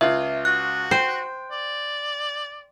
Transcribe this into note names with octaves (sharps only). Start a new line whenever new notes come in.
C#2 F4 E5 F5
F#4 F#6
C5 G5
D5